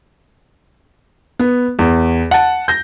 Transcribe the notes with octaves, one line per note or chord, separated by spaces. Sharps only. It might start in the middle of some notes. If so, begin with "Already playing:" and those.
B3
E2
F#5 A5
G6 A#6